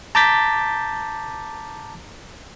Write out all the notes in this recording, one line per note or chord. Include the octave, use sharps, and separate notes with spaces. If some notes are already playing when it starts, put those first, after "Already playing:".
A5 A#5 D6 G6 A6 B6